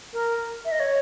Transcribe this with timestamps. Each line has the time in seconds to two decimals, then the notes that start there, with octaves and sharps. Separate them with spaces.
0.13 A#4
0.65 E5
0.72 D#5
0.80 C#5